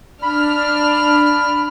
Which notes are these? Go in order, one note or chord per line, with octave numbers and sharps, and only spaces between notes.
D4 B5 F6